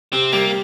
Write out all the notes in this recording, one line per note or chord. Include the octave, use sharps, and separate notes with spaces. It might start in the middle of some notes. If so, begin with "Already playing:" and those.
C3 C4
G3 A#3